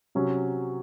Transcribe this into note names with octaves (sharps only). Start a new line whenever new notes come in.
C3 F#3 C#4